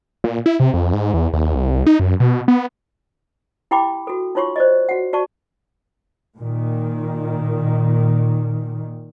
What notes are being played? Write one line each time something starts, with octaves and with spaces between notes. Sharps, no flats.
A#2
E4
C3
F2
G#2
E2
D#2
C2
D#4
F#2
B2
B3
E4 G4 G5 B5 D6
F#4 A4
D#4 F4 C#5 C6 C#6
C5 D5 D#5
F#4 F#5
F#4 D5 A5 C#6
A#2 D#3